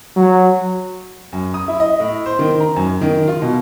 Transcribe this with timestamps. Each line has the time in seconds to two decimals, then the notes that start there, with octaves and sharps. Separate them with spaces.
0.16 F#3
1.33 F#2
1.54 D#6
1.68 E4
1.80 D#5
2.00 A2
2.26 C5
2.39 D#3
2.60 A#5
2.76 F#2
3.01 D#3
3.28 F4
3.42 B2